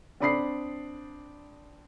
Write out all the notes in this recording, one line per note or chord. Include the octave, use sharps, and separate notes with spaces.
C4 D4 D5 B5 D#6 C7